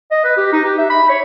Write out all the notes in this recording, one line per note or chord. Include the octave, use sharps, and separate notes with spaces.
D#5
B4
G4
D#4
G4
E5
B5
C#5